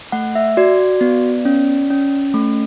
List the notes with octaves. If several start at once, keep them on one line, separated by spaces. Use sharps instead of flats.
A3 F#5
E5
F#4 D5
B3
C#4
C#4
A3